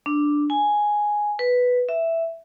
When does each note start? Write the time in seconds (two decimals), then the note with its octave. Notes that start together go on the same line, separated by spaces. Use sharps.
0.06 D4
0.50 G#5
1.39 B4
1.89 E5